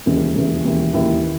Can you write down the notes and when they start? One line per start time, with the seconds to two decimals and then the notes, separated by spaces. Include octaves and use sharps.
0.06 E1 D#2 C#3 E3 D#4
0.35 E1 D#2 C#3 E3
0.65 E1 D#2 C#3 E3
0.93 E1 D#2 C#3 E3 E4
1.24 D#3